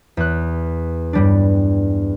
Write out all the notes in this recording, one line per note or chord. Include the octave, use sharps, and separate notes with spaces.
E2 F#6
G2 G3 D4